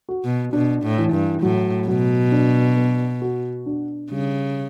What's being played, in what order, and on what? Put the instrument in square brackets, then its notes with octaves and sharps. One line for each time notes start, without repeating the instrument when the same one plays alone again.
[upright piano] F#4
[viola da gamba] B2
[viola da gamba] B2 [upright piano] D4
[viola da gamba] A2
[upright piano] E3
[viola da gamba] G2
[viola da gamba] A2 [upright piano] F#3
[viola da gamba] B2 [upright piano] F#3
[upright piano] D4
B3
F#4
D4
[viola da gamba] C#3 [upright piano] G3